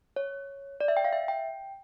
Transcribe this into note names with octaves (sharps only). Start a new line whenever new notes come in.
C#5
D5
E5
G5
F5
E5
G5